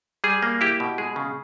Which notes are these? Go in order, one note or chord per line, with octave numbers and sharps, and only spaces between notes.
G3 G#4
A#3
E4 G4
B2
G#3 G#4
C#3